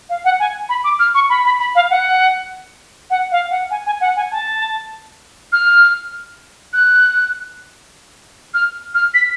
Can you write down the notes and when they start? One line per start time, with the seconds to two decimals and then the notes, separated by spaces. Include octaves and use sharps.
0.09 F5
0.25 F#5
0.40 G#5
0.69 B5
0.84 D6
0.99 F6
1.14 C#6
1.30 B5
1.45 B5
1.60 B5
1.75 F5
1.90 F#5
3.10 F#5
3.31 F5
3.51 F#5
3.71 G#5
3.86 G#5
4.01 F#5
4.16 G#5
4.31 A5
5.52 F6
6.73 F#6
8.54 F6
8.94 F6
9.14 B6